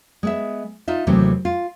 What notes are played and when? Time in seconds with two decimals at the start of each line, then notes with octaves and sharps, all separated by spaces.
0.23 G#3 B3 E5
0.88 D#4 F4 E5
1.07 D#2 C3 E3 F#3 A3 C4
1.45 F4